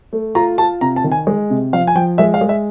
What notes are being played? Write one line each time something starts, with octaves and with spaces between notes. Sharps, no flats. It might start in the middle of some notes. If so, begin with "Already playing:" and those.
A3
F4 A#5
F4 A5
C3 A#5
A5
D#3
G#5
G#3
C3
F3 F5
G#5
F3 G5
G#3 E5
F5
G#3
E5